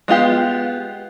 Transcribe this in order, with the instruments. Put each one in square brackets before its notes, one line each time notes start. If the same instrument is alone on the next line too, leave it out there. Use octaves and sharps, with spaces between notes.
[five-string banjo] G#3 B3 F4 G4